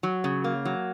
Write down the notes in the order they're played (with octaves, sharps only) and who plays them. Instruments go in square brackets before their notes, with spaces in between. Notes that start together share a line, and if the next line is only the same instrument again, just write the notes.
[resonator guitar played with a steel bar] F#3
C#3
A#3
F#3